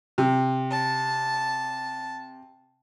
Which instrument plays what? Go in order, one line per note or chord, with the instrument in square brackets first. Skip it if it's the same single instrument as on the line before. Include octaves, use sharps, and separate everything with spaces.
[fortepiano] C3
[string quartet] A5